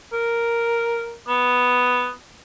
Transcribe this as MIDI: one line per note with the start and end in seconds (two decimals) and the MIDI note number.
0.13 1.14 70
1.28 2.11 59